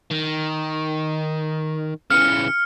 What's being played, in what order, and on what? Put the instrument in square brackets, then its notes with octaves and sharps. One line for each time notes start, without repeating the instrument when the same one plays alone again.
[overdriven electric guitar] D#3
[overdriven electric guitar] C#3 E3 [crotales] F6 C#7